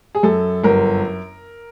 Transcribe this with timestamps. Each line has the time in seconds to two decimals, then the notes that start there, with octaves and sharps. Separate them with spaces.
0.15 G#4
0.23 F#2 A4
0.64 G1 A#4